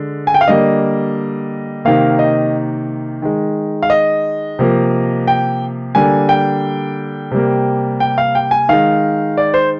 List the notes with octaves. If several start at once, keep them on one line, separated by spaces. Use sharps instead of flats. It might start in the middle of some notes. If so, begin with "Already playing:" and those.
Already playing: D3 G#3
G#5
G5
F5
D3 G3 A#3 D#5
C3 D#3 A#3 F5
D#5
D#3 G#3
F5
D#5
C3 F3 A#3
G5
D3 G3 A#3 G#5
G5
C3 G3 A#3
G5
F5
G5
G#5
D#3 G#3 F5
D5
C5